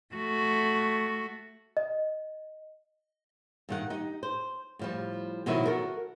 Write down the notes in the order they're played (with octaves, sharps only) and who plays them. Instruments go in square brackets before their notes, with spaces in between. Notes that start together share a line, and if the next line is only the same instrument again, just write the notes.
[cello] A3 F#4
[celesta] D#5
[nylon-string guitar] G2 D#3 F#5
D#4 G4
C5
A2 F3 G3
B2 D#3 F3 F#3 E4 F#4
F#4 A4 A#4